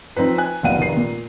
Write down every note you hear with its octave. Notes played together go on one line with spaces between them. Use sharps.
F3 C4 D#4 B4
G#5 F#6
F1 B1 A#2 F5 F#5 D#7
F1 D#3 C7
A#2